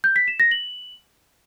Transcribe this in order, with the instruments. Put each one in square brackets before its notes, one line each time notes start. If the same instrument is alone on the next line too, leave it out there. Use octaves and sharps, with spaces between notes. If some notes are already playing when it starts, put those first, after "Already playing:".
[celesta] G6
B6
E7
A#6
F#7